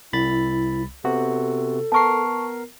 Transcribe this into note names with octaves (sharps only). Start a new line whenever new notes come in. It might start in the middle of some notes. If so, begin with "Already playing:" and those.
C2 E4 B5 A6
C3 B3 F#4 A4
B3 A#4 A5 C#6 C7